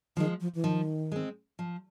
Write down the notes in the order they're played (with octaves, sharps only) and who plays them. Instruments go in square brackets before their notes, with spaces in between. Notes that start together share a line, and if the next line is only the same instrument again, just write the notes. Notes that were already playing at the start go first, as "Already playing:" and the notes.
[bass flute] D#3 [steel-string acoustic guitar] F3 G#3
[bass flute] F3
E3
[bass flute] D#3 [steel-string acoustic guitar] F3
[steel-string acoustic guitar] G#3 C4
F3